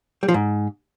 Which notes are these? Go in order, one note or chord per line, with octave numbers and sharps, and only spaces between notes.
G3
F3
G#2